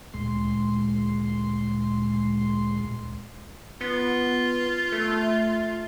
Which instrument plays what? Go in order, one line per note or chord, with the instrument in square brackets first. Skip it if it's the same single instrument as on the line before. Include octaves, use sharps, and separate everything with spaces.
[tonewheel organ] D2 A#2 G#3 C6
[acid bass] B3 [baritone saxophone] F4
[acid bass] A3